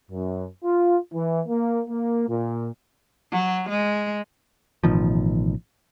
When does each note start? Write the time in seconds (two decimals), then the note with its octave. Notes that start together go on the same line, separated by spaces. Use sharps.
0.11 F#2
0.64 F4
1.13 E3
1.48 A#3
1.87 A#3
2.29 A#2
3.31 F#3
3.69 G#3
4.84 A1 B2 D#3 F3